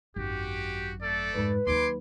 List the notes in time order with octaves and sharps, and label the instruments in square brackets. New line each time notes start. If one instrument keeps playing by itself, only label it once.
[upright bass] G#1 F#2 [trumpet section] F#4 G4
[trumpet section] A3 A4 D5
[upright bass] F2 G#2 [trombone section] B4
[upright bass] D#2 F#3 [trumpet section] G#5 C6 D6